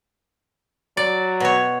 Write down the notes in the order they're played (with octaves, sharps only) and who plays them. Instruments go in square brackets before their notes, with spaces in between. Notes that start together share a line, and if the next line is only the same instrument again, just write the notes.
[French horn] F#3 [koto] D5
[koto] B2 C#5